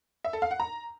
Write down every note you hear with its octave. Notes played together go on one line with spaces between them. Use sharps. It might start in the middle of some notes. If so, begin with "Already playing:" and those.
E5
A4
F5
F#5
A#5